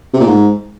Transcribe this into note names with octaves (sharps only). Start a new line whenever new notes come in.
C3
A#2
G#2